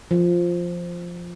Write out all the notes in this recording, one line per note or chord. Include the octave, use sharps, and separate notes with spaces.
F3